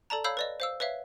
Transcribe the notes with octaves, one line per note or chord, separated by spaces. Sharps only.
A4 D5 A5 A#5
C#5 F5 B5 E6 G6
B4 D5 D#5
C5 F5 E6
B4 C#5 E5 F5